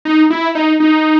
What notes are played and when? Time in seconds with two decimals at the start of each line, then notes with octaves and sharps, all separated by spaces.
0.05 D#4
0.30 E4
0.55 D#4
0.80 D#4